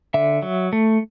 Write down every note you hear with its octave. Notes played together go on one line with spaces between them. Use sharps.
D3 E5
F#3
A3